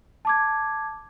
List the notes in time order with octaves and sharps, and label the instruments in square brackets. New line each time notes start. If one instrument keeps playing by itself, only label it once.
[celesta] A5 D6 G#6